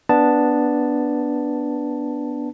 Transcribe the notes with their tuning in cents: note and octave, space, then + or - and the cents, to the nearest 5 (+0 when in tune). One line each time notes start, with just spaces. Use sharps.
B3 -5 D4 +0 A5 +0